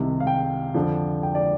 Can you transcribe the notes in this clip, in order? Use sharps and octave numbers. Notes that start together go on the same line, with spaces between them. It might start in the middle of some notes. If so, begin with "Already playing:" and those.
Already playing: C2 C3 D#3
F5
G5
F2 D3 F3
G5
D5